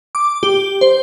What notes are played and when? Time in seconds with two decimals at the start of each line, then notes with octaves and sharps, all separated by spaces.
0.15 D6
0.43 G4
0.81 C5